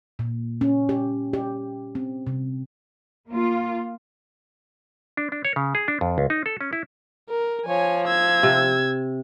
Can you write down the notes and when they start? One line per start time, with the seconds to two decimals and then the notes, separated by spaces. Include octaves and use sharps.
0.19 A#2
0.61 C#4
0.89 G4
1.33 G4
1.95 C4
2.27 C3
3.28 A#3 F4
5.17 D4
5.32 D4
5.45 C#5
5.56 C#3
5.75 G#4
5.88 D4
6.01 F2
6.18 C#2
6.30 D#4
6.46 A4
6.61 C#4
6.73 E4
7.29 A#4
7.66 F3 C#5 G#5
8.07 E6 G#6
8.43 C3